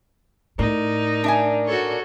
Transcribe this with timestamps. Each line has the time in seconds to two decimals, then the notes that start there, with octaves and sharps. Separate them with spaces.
0.59 A2 D#4 A#4 D5
1.24 D4 E5 G#5
1.66 F#4 A4 C#5